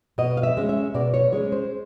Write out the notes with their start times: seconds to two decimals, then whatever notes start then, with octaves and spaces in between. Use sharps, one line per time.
0.18 B2 D#5
0.37 F5
0.43 E5
0.57 G#3 C#4
0.69 E5
0.94 B2 D5
1.14 C#5
1.32 G#3 C#4 C#5
1.52 C5